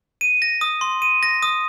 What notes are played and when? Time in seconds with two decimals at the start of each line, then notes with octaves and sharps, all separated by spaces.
0.21 D#7
0.42 A#6
0.61 D#6
0.81 C6
1.02 D#7
1.23 A#6
1.43 D#6